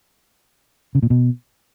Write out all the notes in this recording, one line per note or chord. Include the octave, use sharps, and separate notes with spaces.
C#3
A#2
B2